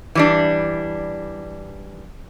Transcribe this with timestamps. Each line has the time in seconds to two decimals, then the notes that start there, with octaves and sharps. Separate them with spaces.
0.15 E3 G3 D4